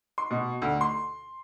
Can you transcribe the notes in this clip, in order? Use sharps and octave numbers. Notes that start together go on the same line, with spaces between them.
C6
B2
D2
C6